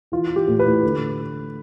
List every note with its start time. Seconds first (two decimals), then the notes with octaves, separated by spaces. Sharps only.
0.12 E3 F4
0.30 E3
0.36 G4
0.48 A2
0.59 B4
0.65 A2
0.83 D3